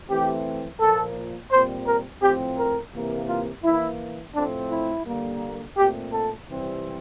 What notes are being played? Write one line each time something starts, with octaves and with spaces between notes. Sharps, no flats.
E3 A3 C4 G4
A#2 F3 A#3 A4
A#2 G3 C4 C5
A#4
A2 F3 C4 G4
A#4
C3 E3 A#3
F4
E3 A#3 E4
A2 F3 A3 C4 D4
E4
D3 G3 A#3
A#2 A3 C4 G4
A4
C3 E3 G3 C4